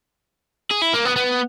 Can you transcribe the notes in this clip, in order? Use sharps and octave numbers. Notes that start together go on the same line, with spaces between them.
G#4
E4
A#3
B3
B3